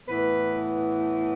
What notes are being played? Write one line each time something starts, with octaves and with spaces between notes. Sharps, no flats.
A2 E3 B3 B4